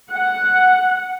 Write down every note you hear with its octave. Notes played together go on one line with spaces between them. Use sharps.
F#5